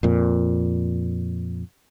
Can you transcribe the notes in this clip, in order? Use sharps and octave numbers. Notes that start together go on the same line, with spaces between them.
F2 A#2